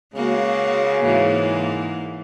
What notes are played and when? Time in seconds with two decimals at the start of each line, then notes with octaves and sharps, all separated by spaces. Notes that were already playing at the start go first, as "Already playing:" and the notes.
0.15 C#3 G#3 A#3 F#4
1.04 G#2 E3 A#3